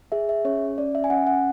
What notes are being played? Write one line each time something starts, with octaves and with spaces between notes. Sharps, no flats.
G#4 E5
E5
C#4 C#5
C#4 D5
E5
G#5
C#4 F#5
F#5